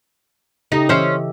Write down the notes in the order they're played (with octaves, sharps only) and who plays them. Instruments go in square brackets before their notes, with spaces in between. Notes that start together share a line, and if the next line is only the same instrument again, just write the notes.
[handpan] C#3 G4 A4 [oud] D#4
[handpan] E3 D#5 E5 [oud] C#4 C5